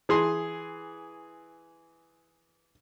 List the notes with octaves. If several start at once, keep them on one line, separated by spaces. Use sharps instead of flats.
E3 G#4 C6